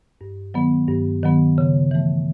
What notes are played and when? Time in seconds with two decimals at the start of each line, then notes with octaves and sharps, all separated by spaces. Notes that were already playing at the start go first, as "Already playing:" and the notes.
0.21 G2
0.54 D#3 F#3 B3
0.89 G2
1.23 D#3 F#3 B3
1.58 C#3
1.91 E3 A3